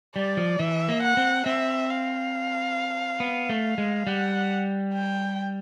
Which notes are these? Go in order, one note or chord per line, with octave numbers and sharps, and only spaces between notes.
G3 D5
F3
E3 E5
A#3
F#5
C4
C4 E5
F5
B3
A3
G#3
G3 F#5
G5